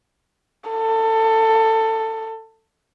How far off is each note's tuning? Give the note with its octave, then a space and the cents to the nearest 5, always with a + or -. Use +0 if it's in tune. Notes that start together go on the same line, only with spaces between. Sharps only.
A4 +20